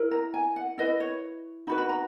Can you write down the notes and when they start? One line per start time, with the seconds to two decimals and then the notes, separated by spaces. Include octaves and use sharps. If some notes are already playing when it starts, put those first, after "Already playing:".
Already playing: E4 A#4
0.11 A#5
0.34 G#5
0.56 F#5
0.78 E4 B4 D#5
1.00 C#5
1.67 D#4 F#4 B4 B5
1.78 B5
1.89 A#5